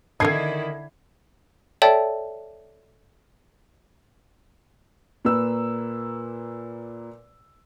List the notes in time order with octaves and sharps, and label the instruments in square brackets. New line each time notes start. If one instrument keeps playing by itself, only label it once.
[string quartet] D3 E4 [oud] D#3 [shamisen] A4 A#4 D#5 [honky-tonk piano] G#6 C7
[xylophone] A4 C#5 D5 E5 G5 A5
[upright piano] A#2 A#3 B4 E6